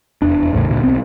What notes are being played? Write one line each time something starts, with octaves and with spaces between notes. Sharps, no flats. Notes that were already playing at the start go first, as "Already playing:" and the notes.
F1 E2 E3 D4
A1 E2 A2 C#3
D2 A#2 D3
B1 B3 C4